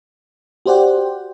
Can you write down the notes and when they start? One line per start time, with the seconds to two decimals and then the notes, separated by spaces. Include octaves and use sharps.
0.66 F#4 G4 C5 D5 F#5 G5